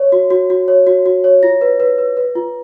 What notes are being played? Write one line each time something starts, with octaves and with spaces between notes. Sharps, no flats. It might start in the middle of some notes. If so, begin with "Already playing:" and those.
Already playing: C#5
F#4
F#4
F#4
C#5
F#4
F#4
C#5
F4 A#6
B4
B4
B4
B4
F4